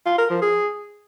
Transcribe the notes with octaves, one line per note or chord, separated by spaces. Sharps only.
F4
A#4
F3
G#4